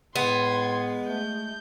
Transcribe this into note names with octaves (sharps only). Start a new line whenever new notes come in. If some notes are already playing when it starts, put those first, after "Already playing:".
A2 G#3 B3 C6 G#6
A3 G6